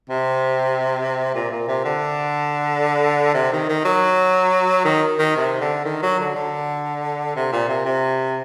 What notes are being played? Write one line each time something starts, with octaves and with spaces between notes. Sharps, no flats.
C3
A#2
A#2
C3
D3
C3
D#3
D#3
F#3
D#3
D#3
C3
D3
D#3
F#3
D3
D3
C3
A#2
C3
C3